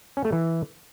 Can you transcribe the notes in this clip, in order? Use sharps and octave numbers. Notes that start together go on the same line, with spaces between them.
C#4
A3
E3